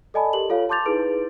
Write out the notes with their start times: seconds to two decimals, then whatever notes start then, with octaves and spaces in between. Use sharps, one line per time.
0.14 A4 D5 D#5 G#5 A5 B5
0.33 G4 A4 A#4 F#7
0.49 F4 A4 C#5 F5
0.69 A5 C6 D6 G6 A6 F7
0.86 D#4 E4 G#4 B4 D7